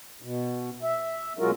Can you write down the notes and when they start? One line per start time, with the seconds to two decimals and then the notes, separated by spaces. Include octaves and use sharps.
0.22 B2
0.83 E5
1.39 B2 F#3 G#3 F4 F#4 A#4